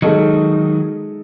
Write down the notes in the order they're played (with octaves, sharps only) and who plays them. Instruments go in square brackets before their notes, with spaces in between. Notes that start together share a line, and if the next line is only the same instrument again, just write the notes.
[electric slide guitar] D#3 F#3 [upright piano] G#3 D#4 A4 D#5